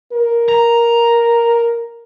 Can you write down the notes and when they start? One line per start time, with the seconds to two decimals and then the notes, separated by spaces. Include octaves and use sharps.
0.12 A#4
0.48 A#5